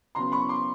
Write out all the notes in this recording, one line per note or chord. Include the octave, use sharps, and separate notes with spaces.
C#3 F#3 B3 A#5 C6
B5 C#6
C6 D6